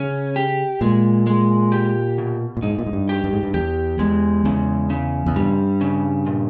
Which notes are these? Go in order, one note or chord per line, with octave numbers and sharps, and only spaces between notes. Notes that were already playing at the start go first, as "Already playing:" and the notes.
Already playing: C#3 C#4
G4
A#2 G#3
G#3
G4
B2
A#2
G#2 D#4
A#2
G#2
G2
G4
G2
G#2
G2
E2 G4
E2 G#3
E2 C#3
C#3
E2
G2 G3
C#3
A#2